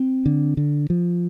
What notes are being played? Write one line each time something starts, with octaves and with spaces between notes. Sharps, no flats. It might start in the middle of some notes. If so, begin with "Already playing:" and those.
Already playing: C4
D3
D3
F3